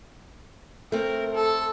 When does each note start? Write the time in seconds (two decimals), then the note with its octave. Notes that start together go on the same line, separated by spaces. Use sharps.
0.92 A3 C4 A#4
1.34 A4